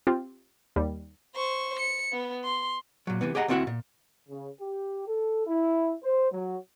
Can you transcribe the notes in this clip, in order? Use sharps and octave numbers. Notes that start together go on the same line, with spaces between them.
C4 F4 G4
D#2 G3
C5 C#6
C#7
B3
C6
A#2 F#3
C3 E3 B3
G4 G#4 D#5 F#5 A#5
D2 C4 E4 F#4 E5 F#5
A#2
C#3
G4
A4
E4
C5
F#3